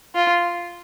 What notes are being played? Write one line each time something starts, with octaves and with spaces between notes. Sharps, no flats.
F4